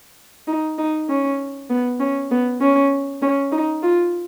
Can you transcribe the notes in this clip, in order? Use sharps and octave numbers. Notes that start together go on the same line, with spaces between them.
D#4
D#4
C#4
B3
C#4
B3
C#4
C#4
D#4
F4